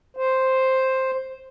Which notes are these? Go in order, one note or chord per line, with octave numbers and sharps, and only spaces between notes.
C5